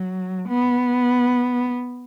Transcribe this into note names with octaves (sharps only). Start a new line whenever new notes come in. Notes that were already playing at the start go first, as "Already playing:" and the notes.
Already playing: F#3
B3